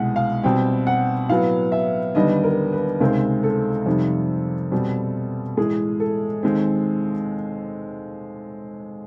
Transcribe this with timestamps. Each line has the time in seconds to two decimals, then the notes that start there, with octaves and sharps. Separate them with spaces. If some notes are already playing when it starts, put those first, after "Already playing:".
Already playing: C2 B2 G#3 F#5
0.16 F5
0.43 B2 G3 C4 G5
0.87 F#5
1.29 A2 F#3 B3 F5
1.72 E5
2.15 D#2 D3 G3 B3 D#5
2.43 A#4
2.73 B4
3.00 C#2 C3 D#3 G#3 C4 A#4
3.43 A4
3.86 F2 C3 D#3 G3
4.72 B2 G3 C4
5.57 A2 E3 G#3 G#4
6.00 A4
6.43 D#2 D#3 G#3 C4